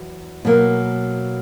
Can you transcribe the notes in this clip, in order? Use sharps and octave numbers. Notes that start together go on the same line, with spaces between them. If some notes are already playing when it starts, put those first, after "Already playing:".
Already playing: E2 F#3
B2 F#3 A#3